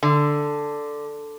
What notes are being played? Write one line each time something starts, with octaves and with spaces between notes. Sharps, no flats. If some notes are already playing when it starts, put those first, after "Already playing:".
D3